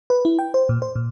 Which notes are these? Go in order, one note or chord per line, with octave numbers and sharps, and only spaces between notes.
B4
E4
G5
C5
A#2
C5
A#2